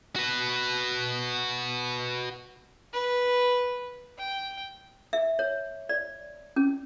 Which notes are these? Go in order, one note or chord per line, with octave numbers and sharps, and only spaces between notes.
F#4 B4
B4
G5
E5
C#5
D5
C#4